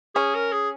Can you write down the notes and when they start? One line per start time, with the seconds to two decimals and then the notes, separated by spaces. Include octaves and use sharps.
0.15 C#4 G#4
0.34 A#4
0.52 G#4